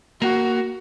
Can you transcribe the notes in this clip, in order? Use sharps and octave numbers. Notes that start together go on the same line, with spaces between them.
A#3 F#4